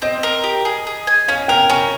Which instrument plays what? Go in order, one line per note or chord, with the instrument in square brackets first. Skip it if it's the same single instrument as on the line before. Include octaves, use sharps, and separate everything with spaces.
[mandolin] C4 [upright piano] D#5
[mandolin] A#4
G4
G#4
G#4
G#5
[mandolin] C#4 [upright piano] F5
[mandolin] A#4 [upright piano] G5
[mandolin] C#4 [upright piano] G#5